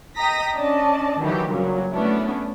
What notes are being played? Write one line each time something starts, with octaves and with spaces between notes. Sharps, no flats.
D#5 G5 A#5 D#6 A#6 B6
C#4 D4 D5 D#5 A5
D#3 E3 F#3 F#4 G4
G2 A#2 C#3 F#3 G3
A3 B3 C#4 D4 E4